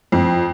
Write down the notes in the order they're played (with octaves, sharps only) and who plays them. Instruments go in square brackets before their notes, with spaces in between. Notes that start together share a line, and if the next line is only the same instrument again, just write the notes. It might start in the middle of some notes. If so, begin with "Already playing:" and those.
[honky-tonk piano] F2